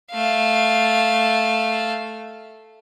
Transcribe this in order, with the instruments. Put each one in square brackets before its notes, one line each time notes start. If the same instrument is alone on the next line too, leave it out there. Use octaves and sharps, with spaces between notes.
[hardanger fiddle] A3 F5